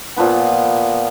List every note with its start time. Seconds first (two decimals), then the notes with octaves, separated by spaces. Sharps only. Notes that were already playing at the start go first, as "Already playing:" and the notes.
0.16 A#2 F3 B3 B4